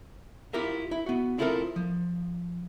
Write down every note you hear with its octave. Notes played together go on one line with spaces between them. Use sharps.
E4 F4 G4 A#4 E5
E4
B3 F#4
C4 E4 F4 G4 A4 A#4
F3